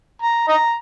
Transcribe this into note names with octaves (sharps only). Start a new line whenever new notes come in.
A#5
D#5 A#5